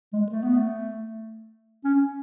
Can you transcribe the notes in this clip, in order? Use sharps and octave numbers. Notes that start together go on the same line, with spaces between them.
G#3
A3
B3
A3
C#4